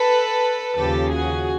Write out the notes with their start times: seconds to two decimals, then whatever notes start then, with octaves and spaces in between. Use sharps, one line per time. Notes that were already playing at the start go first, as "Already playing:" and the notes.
Already playing: A4 B4
0.77 D#2 C#3 F3 G4 A4
1.12 F#4 G#4